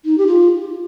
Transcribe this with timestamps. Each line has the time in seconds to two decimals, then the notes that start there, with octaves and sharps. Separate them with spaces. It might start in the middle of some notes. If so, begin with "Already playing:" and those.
0.05 D#4
0.18 G4
0.27 F4